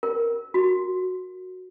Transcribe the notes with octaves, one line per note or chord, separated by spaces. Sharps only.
A#4
F#4